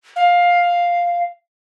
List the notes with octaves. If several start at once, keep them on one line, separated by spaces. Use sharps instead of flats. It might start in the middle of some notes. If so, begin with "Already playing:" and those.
F5